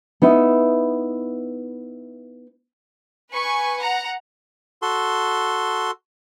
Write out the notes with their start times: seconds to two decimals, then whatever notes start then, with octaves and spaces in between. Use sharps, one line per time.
0.22 B3 D#4 E4
3.32 B4 G#5 C#6
3.82 F#5 A#5
4.82 F#4 A4 C6